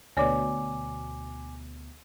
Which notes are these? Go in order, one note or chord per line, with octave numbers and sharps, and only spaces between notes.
D2 B2 C#5 D5 G#5 D6